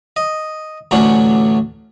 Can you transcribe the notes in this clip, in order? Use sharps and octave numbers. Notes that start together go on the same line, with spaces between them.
D#5
A1 D2 F#3 C#4 D4 F#5